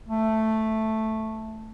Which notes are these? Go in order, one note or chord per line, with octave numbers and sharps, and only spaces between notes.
A3